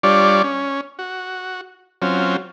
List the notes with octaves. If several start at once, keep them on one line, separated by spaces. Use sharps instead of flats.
G3 D4 F4 C#5 D5
C#4
F#4
F#3 C4 C#4 F4